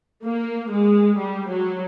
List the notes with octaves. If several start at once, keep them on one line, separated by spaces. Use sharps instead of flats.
A#3
G#3
G3
F#3